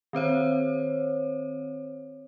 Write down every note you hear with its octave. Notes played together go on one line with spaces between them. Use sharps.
D#3 C4 C5 C#5